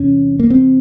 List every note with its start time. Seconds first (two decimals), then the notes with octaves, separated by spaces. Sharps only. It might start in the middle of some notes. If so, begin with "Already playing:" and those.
Already playing: E2 C3 C#4
0.40 A#3
0.50 C4